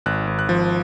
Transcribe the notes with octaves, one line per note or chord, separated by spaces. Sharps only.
G#1 F#6
G#1
F#6
F3